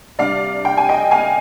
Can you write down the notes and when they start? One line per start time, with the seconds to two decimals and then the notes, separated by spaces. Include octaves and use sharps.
0.19 C3 G3 D4 D5 F5
0.65 G5
0.77 G#5
0.89 D#5 G5
1.11 F5 G#5